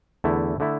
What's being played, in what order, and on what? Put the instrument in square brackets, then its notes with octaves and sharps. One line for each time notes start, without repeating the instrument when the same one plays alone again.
[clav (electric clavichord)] E2 D3 A3 E4
D3 A3 E4